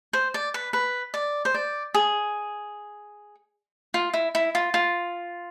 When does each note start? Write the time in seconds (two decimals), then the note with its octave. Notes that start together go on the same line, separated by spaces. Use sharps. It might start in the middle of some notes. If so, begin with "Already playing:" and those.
0.13 C5
0.34 D5
0.54 B4
0.73 B4
1.14 D5
1.45 C5
1.54 D5
1.94 G#4
3.94 F4
4.14 E4
4.35 E4
4.55 F4
4.74 F4